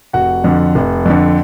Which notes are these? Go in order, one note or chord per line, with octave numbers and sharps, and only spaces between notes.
F1 F#4 F#5
F2 D3
F1
F2 D3